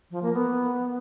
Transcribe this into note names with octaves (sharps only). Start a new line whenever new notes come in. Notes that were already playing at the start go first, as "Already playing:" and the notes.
F3
A#3
B3